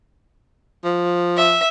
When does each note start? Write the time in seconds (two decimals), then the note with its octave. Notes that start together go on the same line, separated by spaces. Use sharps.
0.84 F3
1.37 E5